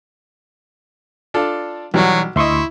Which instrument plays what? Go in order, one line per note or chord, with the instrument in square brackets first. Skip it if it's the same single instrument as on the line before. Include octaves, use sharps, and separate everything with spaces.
[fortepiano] D4 F4 A4
[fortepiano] B1 G3 [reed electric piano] E3 [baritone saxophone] F#3
[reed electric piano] D2 C6 C#6 [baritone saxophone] E4 [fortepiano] D#5 E5